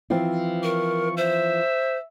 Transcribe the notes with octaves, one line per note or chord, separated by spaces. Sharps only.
E3 F3 C4
A#4 C#6
C5 E5